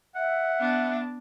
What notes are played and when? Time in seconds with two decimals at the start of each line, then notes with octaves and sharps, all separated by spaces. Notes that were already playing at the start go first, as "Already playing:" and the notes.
0.15 E5 F#5
0.60 B3 D4